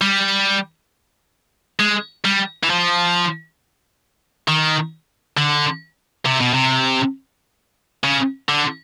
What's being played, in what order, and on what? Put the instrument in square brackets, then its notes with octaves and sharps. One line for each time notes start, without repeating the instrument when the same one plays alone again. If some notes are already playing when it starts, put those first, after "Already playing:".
[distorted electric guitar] G3
G#3
G3
E3
F3
D#3
D3
C3
B2
C3
C#3
D3